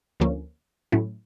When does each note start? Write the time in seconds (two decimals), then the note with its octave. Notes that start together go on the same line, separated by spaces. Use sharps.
0.20 D2 D3 F3 A#3 C#4
0.92 A2 F#3 A3 C#4 E4